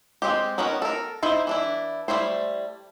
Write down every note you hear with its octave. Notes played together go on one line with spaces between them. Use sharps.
G#3 C4 G4
D#3 B3 C#4 F#4 A#4
A4 A#4
D#4 E4 C5
E3 D4 E4
G3 A3 E4 C5